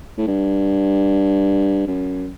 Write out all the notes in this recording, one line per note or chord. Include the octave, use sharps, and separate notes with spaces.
A2
G2
F#2